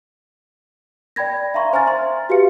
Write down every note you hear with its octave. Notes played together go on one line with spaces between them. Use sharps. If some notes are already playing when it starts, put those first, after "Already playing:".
D5 G5 B5 G#6 A#6
E5 F5 A#5 C6 C#6
C5 G#5 A#5 F6 A6
E5 C6
F#4 G4 B4 F5 C#7